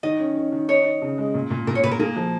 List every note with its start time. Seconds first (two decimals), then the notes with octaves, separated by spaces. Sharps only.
0.03 D#3 D#5
0.20 C#4
0.37 C#4
0.52 D#3
0.68 D#4 C#5
0.86 D#4
1.02 C#3
1.18 G#3
1.34 A#2
1.50 A#2
1.67 A#2 A#4
1.75 C#5
1.83 A#2 B4
1.91 A#4
1.99 A#3 G#4
2.16 F3